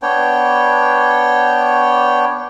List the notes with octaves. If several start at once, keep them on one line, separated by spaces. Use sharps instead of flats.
B3 D4 C#5 G5